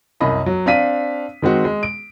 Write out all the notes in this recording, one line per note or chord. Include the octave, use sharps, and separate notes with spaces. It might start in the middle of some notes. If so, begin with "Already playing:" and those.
C2 F#2 C#4 D#5 B5
F#3
C4 D4 F5 B6 D#7
D#3 G#3 C4 F#4
G#3
D7